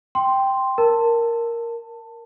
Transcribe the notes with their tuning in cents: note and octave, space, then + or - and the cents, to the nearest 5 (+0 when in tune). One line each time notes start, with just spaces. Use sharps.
G5 +0 C6 +0
A#4 +0 A5 +15